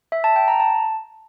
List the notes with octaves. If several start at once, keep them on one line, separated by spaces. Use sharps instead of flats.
E5
A5
G5
A#5
A5